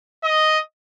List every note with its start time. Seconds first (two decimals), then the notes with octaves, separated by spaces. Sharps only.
0.24 D#5